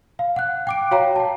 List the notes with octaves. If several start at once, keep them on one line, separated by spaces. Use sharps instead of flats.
F5
F#5 F#6
G5 D6 D7
F#4 C#5 F5 G5 A#5
G5 A5